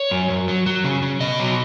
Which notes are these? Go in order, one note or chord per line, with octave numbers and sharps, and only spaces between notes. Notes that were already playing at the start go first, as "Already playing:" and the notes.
Already playing: C#5
F#2
F#2
F#3
F#3
C#3
C#3
B2 D#5
F#3